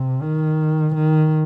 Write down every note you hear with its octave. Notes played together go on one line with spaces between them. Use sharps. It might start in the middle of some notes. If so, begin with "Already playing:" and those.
Already playing: C3
D#3
D#3